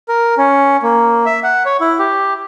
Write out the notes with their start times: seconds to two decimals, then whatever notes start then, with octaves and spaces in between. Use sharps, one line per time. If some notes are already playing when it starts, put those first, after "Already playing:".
0.09 A#4
0.38 C#4
0.83 A#3
1.26 E5
1.44 F#5
1.65 C#5
1.81 E4
1.99 G4